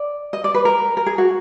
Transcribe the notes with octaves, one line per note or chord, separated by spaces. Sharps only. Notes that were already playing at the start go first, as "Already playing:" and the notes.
Already playing: D5
D#5
D5
B4
A#4
A#4
G#4
F#4